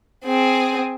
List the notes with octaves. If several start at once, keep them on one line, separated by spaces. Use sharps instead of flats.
C4 G#4